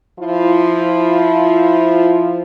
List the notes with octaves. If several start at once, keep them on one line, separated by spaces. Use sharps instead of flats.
F3 E4 F4